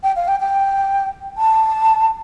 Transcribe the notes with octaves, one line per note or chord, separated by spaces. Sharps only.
G5
F5
G5
G5
A5